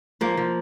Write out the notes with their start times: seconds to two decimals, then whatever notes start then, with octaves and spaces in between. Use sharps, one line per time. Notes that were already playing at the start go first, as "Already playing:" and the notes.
0.21 F3 A#3
0.37 F3